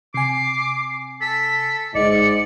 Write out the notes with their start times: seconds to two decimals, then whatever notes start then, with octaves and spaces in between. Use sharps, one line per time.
0.14 C3 G#5 D6 C7
1.21 A4 B6
1.95 G1 G#2 D5 D#5 C#7